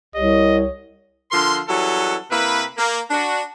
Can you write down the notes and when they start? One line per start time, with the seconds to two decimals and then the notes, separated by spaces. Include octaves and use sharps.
0.15 C2 G4 C#5 D#5
1.31 D3 F3 A#4 C6
1.68 E3 F#3 G3 C#4 G#4 A4
2.30 C3 A#3 E4 B4
2.77 A#3
3.10 D4 F#4